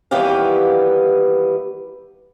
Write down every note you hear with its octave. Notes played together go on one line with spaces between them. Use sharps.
D#2 E3 G3 B3 G4 F5